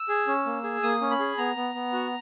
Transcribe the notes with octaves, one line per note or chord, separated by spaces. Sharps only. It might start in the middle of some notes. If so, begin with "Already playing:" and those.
Already playing: E6
G#4
C#4
A#3
G#4
A#3 D#6
C#4
B5
G#4
B3 A#5
B3
B3
F#4